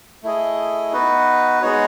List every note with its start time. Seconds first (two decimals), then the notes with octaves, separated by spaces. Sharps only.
0.23 A3 E4 G#4 D#5
0.93 B3 D#4 F#4 B4
1.62 G#3 B3 D#4 F#4 C#5